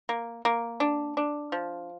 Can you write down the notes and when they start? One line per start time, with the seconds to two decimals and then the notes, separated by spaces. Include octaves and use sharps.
0.09 A#3
0.45 A#3
0.80 D4
1.17 D4
1.52 F3